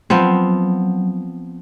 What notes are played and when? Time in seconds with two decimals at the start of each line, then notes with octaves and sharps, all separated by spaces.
0.10 F3 F#3 B3 C4